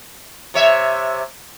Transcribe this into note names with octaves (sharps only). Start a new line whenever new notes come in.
C3 C#5 E5